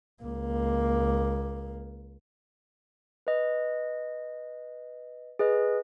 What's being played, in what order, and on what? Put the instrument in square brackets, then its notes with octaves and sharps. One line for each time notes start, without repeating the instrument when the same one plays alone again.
[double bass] C#2 A#3
[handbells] B4 D#5
G#4 B4 D#5